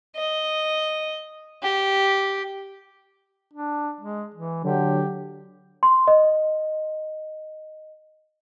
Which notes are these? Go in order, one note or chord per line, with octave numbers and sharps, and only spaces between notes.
D#5
G4
D4
G#3
E3
D3 F#3 G4
C6
D#5